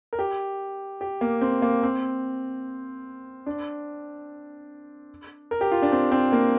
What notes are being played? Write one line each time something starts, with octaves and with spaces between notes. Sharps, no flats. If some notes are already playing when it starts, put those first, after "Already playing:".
A#4
G4
G4
A#3
C4
A#3
C4
D4
A#4
G4
F4
D4
C4
C4
A#3